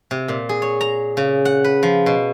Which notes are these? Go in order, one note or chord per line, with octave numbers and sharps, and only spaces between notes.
C3
A#2
G#4
C#5
A#5
C#3
F#5
B4
F3
B2